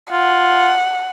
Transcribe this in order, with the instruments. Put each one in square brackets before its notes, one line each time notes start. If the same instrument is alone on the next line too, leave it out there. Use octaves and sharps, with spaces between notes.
[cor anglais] F4 [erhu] F#5